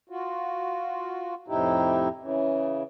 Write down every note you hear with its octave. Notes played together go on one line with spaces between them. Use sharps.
F4 F#4
F2 A2 C3 D#4 E4 G4
C#3 E3